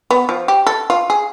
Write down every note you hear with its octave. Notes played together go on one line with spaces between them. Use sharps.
B3
F3
G4
A4
F4
G#4